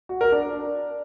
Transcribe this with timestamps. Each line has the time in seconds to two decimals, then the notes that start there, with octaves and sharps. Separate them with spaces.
0.09 F#4
0.21 A#4
0.32 D4